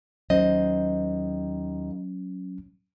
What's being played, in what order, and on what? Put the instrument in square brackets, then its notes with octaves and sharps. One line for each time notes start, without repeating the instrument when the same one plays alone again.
[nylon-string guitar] D#2 C5 D#5 [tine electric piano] F#3 C#4